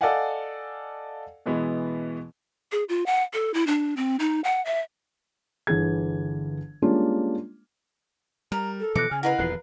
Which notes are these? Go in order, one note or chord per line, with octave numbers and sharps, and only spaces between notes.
A4 D5 D#5 F5 F#5 G#5
B2 E3 G#3 B3
G#4
F4
F#5
A4
E4
D4
C4
D#4
F#5
E5
G1 D3 E3 G#4 G#6
G3 G#3 A#3 C#4 D4 F4
G3 A#4 A#5
A4
B2 E3 F3 D6 F#6 A#6 C#7
C#3 G#5 F6
E4 A#4 B4 D#5 F5 F#5
D#1 E2 F3 F#6 C7